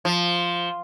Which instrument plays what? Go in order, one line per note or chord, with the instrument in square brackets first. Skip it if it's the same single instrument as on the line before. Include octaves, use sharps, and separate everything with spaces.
[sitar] F3